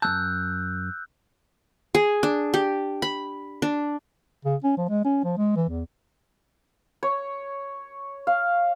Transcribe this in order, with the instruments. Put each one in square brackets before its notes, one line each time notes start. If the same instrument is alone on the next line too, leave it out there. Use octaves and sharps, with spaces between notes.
[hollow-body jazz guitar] F#2 G#3 A5 [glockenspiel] E6 F#6 G6
[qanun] G#4
D4
G4
B5
D4
[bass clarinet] C#3
C#4
F3
G#3
C#4
F3
G#3
E3
E2
[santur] C#5
F5